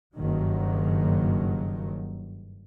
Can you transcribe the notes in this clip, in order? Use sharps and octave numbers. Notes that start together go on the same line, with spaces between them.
F#1 G2 D#3 F#3